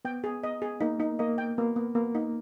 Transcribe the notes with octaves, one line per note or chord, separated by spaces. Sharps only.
B3 G5
G#4
D#5
G#4
A#3 D#4
D#4
A#3 D#5
G5
A#3 B3
B3
A#3 B3
D#4